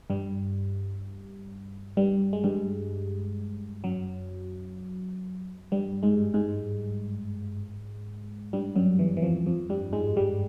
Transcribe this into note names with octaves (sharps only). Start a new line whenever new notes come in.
G2 G3
G2 G3
G#3
G2 G3
F#2 F#3
G2 G3
G#2 G#3
G#2 G#3
G2 G3
F#2 F#3
E2 E3
E3
F2 F3
F2 F3
G2 G3
G#2 G#3
G2 G3